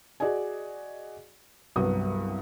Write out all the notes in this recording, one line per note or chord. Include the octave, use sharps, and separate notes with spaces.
F#4 G#4 D5 D#5 G#5
C2 G2 F#3 B3 F#4 D#6